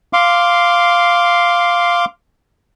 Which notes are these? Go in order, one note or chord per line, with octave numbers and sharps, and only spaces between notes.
F5 C6 D6